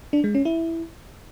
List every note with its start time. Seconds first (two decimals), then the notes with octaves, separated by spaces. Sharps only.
0.13 D4
0.24 G#3
0.35 C#4
0.45 E4